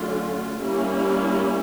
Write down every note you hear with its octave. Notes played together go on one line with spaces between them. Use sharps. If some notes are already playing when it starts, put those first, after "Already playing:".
Already playing: D3 F#3 A3 C#4 F4
G3 A#3 C#4 E4